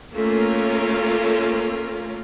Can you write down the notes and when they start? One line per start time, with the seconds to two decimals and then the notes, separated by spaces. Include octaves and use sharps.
0.15 A3 A#3 C#4 F4 A4 A#4